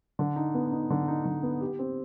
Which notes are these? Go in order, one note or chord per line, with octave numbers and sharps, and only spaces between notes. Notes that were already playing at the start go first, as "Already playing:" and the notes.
D3
D#4
B3
D#4
D3
D#4
D3
B3
G4
C4